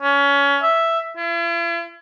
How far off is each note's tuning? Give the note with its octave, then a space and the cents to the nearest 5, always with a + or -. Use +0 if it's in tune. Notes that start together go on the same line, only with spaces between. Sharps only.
C#4 +25
E5 +5
E4 +45